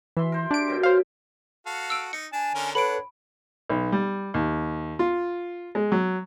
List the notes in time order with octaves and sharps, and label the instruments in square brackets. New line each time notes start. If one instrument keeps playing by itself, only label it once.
[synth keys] E3 [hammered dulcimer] E5 C6
[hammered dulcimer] A#4 C5
[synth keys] D4 D7 [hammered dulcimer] G4
[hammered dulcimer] F#2 B2 G5
[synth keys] C5 F5
[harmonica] F#4 A4 F5
[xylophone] E6 D7
[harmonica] D#4 [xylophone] C#7
[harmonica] D4 A5 [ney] G#5
[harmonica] D3 C#4 A#4
[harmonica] D4 F#5 [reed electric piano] A4 B4 [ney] C#5 [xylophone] B5 D7
[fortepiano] B1
G3
D#2
F4
G#3
F#3